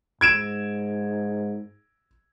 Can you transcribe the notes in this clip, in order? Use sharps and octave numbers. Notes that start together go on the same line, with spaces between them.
G#2 G#6 D7 E7